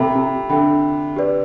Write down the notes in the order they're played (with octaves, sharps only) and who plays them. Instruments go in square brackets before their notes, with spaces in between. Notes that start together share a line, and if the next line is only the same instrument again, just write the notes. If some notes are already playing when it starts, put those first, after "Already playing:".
Already playing: [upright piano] C3 [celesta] A4 E5 G5 B5
[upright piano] C3
[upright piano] D3 [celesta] A4 E5 G5 B5
[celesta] G4 B4 D5